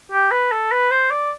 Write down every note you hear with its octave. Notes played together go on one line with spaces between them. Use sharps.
G4
B4
A4
B4
C5
D5